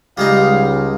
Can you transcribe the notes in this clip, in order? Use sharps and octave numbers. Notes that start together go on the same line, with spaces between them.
C#2 G3 G#3 D#4 F5